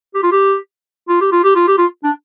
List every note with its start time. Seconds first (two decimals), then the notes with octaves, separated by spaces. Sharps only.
0.14 G4
0.23 F4
0.32 G4
1.08 F4
1.21 G4
1.32 F4
1.44 G4
1.55 F4
1.67 G4
1.78 F4
2.04 D4